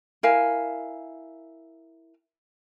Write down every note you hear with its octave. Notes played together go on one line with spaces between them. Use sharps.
E4 A#4 F5 G#5